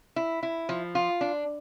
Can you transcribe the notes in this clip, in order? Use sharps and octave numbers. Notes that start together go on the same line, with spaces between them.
E4
E4
F3
F4
D4